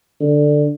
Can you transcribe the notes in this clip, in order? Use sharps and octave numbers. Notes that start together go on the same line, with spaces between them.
D3